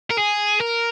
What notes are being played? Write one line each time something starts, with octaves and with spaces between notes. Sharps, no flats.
A#4
G#4
A#4